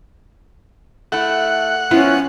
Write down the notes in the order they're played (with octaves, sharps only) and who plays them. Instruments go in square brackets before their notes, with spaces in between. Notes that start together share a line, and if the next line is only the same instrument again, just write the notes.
[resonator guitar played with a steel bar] A3 E4 [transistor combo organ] F#5
[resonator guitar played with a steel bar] F3 B3 [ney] C#4 [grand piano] E4